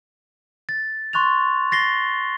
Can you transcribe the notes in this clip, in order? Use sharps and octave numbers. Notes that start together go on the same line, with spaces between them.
A6
C6 C#6 F#6 A6 F7
A6 A#6 C7 G7